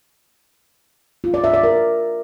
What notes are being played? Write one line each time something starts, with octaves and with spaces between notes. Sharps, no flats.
F4
D5
E5
D5
A#4